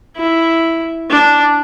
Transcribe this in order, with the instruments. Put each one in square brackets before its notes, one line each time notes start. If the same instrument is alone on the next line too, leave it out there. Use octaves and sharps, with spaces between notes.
[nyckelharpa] E4
D4